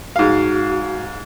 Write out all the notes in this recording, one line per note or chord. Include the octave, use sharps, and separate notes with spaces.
G#2 F#4 F5